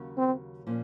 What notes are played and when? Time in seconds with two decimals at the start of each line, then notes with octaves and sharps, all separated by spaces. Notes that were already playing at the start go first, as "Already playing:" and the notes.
Already playing: D#2 C#3 F#3 C#4
0.17 C4
0.67 A#2 F3 A#3 C#4